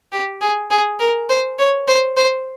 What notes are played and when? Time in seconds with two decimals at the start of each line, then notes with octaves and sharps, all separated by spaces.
0.12 G4
0.41 G#4
0.71 G#4
1.00 A#4
1.30 C5
1.59 C#5
1.88 C5
2.17 C5